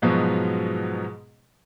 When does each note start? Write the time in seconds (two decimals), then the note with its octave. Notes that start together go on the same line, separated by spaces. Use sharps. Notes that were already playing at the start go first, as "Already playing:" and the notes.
0.02 G#2 B2 F3 F#3 G#3 B3